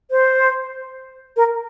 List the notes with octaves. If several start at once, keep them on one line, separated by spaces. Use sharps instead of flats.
C5
A#4